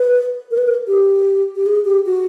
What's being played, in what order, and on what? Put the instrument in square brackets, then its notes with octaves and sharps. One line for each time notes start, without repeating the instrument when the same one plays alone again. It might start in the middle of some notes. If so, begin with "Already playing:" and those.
Already playing: [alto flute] B4
A#4
B4
A#4
G4
G4
G#4
G4
F#4